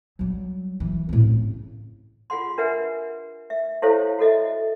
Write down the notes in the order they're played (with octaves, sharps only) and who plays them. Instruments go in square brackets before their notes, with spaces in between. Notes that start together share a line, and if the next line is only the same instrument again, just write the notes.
[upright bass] F#3 G3
E3
A2 C4
C#3
[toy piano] F4 G#4 F#5 C6
D4 A#4 B4 E5 F#5 G#5
E5
E4 G4 A4 C5 C#5 F5
F#4 A4 D#5 E5